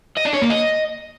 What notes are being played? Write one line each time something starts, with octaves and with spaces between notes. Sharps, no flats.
D#5
D4
C#5
A#3
D#5